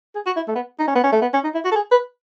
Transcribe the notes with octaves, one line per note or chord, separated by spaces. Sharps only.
G#4
F#4
E4
A3
B3
D#4
C#4
B3
C#4
A3
B3
C#4
D#4
E4
F#4
A4
G#4
B4